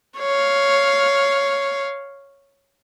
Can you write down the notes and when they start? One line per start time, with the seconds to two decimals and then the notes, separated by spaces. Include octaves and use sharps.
0.19 C#5 F5